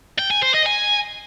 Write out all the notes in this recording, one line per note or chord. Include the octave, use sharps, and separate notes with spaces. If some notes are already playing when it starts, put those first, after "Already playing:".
G5
G#5
C5
D#5
G#5